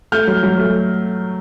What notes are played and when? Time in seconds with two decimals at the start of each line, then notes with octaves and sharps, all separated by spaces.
0.12 A3 F6 G6
0.27 F#3
0.43 F#3
0.58 A3